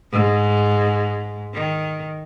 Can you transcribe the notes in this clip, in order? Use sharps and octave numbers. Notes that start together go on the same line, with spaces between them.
G#2
D#3